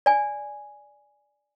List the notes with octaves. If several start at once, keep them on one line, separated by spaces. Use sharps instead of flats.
D5 G#5